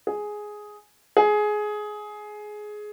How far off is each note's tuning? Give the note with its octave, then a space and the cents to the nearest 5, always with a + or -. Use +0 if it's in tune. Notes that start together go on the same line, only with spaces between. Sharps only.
G#4 +5
G#4 +15